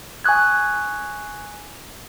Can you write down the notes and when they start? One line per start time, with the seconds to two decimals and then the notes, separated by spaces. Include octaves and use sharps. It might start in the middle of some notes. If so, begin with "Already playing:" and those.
0.24 G#5 C#6 D#6 F#6 G#6